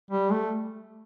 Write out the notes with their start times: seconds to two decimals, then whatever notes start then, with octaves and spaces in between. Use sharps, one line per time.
0.11 G3
0.31 A3